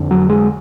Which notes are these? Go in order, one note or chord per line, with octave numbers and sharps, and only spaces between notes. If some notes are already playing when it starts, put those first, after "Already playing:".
Already playing: F2 D3
F#3
G#3